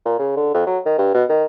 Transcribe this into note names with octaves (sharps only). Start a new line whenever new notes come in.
A#2
C#3
D3
F2
F#3
D#3
G2
B2
D#3